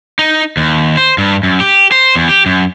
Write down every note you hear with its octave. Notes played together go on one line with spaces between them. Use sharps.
D#4
D#2
C5
G2
F#2
G4
C5
E2
G4
F#2